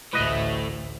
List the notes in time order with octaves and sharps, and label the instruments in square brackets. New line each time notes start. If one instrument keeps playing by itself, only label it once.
[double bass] A1 D2 [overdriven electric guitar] A2 A3 [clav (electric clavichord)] B4 D#5